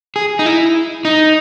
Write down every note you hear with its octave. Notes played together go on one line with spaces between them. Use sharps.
G#4
D#4
E4
D#4